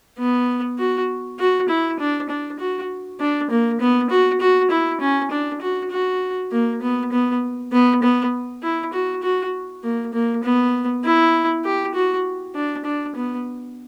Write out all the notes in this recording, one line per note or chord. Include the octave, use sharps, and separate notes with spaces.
B3
F#4
F#4
E4
D4
D4
F#4
D4
A#3
B3
F#4
F#4
E4
C#4
D4
F#4
F#4
A#3
B3
B3
B3
B3
E4
F#4
F#4
A#3
A#3
B3
E4
G4
F#4
D4
D4
B3